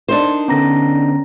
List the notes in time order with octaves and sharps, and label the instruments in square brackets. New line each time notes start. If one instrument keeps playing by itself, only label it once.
[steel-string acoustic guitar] D4 D#4 C5 [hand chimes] A#4
[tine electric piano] D3 B3 [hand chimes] C#4 A#5 A#6